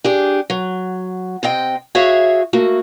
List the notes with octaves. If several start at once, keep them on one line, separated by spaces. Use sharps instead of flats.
D4 G4 G#4
F#3
C3 C4 D#5 G5
F#4 G#4 C#5 E5 F5
A3 A#3 F#4